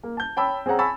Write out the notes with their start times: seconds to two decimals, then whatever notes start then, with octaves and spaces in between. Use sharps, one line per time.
0.03 A#3
0.17 A5 G6
0.36 C#5 G5 A5 B5 E6
0.66 C4 G#4 C#5 F#5 A#5
0.79 G#5 A5 B5 C#6 E6 A6